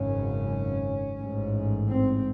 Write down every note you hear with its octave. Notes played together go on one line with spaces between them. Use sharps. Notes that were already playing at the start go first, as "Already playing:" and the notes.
Already playing: G#1 F#2 C#3 C#4
A1 G#2
C4